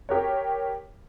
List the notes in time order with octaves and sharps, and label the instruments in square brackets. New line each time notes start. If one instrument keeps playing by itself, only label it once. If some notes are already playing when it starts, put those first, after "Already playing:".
[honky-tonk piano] G4 A#4 C#5